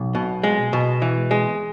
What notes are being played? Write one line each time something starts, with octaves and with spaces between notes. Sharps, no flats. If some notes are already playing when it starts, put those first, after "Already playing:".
Already playing: B1
B2
G#3
B2
E3
G#3